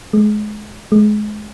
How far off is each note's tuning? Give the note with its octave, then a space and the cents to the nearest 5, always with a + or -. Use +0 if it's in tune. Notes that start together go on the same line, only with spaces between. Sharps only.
G#3 +25
G#3 +25